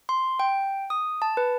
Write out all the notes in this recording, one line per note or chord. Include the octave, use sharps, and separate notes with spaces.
C6
G5
D#6
A5
B4